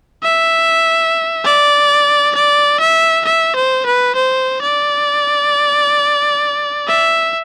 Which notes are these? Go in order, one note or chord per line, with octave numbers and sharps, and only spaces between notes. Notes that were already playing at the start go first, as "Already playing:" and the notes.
E5
D5
D5
E5
E5
C5
B4
C5
D5
E5